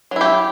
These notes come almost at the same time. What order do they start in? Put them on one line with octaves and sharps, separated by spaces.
F#3 E4 G4